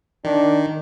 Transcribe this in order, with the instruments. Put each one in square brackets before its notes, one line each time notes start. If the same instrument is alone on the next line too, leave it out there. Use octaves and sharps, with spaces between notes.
[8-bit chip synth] D#3 [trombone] D4